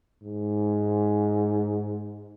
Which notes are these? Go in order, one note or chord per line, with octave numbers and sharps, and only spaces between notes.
G#2